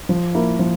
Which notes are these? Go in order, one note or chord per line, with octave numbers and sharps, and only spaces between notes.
F3
A#3 E4 A#4
F3